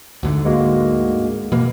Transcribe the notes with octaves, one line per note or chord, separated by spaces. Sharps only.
D2 G#2 D3
G#3 A#3 F#4
B2 E3 A#3